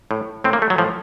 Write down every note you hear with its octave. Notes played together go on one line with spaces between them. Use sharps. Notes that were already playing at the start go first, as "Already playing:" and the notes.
A2
A2 C4
A#3
A3
F#3
A2 F3